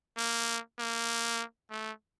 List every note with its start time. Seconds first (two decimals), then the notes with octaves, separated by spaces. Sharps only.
0.17 A#3
0.79 A#3
1.70 A3